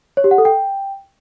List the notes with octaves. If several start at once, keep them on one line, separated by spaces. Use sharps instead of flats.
C#5
G4
F#5
A4
G5